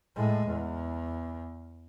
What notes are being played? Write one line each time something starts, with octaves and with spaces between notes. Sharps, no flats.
A2 G#3
E2